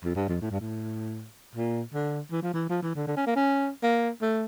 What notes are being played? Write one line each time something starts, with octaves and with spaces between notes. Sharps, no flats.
F2
G2
F2
A2
G2
A2
A#2
D3
E3
F3
E3
F3
E3
D3
D3
C#4
A#3
C#4
A#3
A3